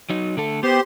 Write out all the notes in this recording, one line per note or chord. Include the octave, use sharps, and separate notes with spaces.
F#3 D#4
D3 A3 A4
B3 G4 C5 C6